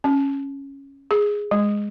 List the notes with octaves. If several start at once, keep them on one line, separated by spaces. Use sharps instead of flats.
C#4
G#4
G#3